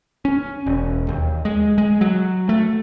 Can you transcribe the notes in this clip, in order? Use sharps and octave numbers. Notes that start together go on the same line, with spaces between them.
C#4
E1
D#2
G#3
G#3
F#3
A3